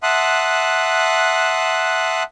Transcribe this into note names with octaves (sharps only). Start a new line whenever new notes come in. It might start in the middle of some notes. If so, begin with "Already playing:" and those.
E5 F#5 A5 C6 D#6 F#6